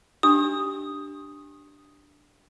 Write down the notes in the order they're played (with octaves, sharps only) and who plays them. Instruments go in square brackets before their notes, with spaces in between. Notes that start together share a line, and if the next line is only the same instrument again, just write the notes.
[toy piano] D4 G4 [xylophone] D#6